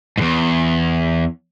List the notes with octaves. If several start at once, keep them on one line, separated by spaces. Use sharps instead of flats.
E2 G#2